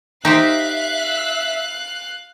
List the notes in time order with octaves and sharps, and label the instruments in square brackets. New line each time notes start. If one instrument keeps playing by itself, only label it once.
[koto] D#4 G4 C5 [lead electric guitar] E5 [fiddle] F5 F#6